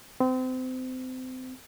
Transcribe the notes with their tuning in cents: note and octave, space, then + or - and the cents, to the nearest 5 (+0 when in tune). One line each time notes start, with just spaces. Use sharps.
C4 -30